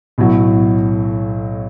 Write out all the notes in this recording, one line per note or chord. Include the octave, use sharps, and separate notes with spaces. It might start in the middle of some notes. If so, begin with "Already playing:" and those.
B1 A2 F#3